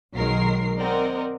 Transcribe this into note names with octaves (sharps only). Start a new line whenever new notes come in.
B1 D#3 F#3 G#3 A#4 C7
C4 A#4 D5 D#5 F#5